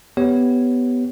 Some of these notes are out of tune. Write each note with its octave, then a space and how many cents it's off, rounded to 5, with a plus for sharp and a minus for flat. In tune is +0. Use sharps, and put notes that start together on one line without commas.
B3 +5 G4 +0 C#5 +0